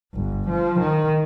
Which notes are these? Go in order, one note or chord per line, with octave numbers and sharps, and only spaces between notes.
G1
F3
D#3